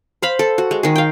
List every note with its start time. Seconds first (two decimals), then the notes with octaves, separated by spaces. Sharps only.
0.22 C5 F5 B5
0.39 A4
0.58 F#4
0.71 G#3
0.83 D#3 G#4
0.96 F5 G5